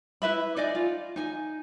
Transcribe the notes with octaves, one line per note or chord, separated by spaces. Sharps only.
E4 B4 E5 B5
D#4 D5 D#5 G#5
F4
D#4 G#5